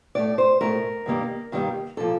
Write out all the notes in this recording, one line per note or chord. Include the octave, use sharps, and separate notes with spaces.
A2 A3 D5
C5
A2 A3 A#4
G2 D#3 G3 A#3
G2 D#3 G3 A#3
A#2 F3 A#3 A4